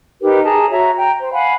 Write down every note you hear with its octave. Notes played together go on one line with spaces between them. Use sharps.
D#4 G4 A#4 B4
G#4 A5 A#5
F#4 C#5 E5 A#5
G5 A#5
C5
F5 F#5 G#5 B5